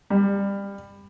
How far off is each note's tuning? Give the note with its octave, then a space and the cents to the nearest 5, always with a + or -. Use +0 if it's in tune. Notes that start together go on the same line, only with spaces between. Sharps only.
G3 +25